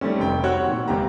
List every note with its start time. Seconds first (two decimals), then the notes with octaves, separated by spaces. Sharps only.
0.01 D#3 G3 A3 C4 C#4
0.20 F1 G5
0.43 C4 F#4 C#5 F#5 E6 F#6
0.66 A#2 D#3
0.88 E1 C#2 C4 G4 A#5